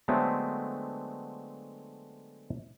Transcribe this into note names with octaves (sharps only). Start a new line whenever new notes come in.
D3 F#3 G#3 A3 B3 C4